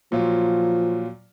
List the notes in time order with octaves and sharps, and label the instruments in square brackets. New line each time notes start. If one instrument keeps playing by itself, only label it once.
[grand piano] A#2 F#3 F4 [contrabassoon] F3